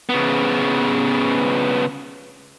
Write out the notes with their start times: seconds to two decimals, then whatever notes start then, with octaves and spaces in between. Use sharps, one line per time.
0.09 C#3 B3